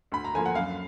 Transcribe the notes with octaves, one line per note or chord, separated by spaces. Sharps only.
D2 B5
A#5
D3 F3 A#3 G#5
F#5
F#2 F5